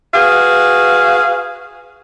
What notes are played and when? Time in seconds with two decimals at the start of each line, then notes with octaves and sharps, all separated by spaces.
0.14 F#4 G#4 B4 F5